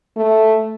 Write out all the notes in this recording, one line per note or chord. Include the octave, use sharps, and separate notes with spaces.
A3